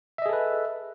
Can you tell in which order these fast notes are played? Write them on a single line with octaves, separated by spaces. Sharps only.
E5 D#5 G#4 A4 B4